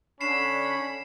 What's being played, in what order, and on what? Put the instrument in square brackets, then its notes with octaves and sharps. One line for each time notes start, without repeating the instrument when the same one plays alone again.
[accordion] D3 D4 [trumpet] C#4 [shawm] B5 [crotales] C7 E7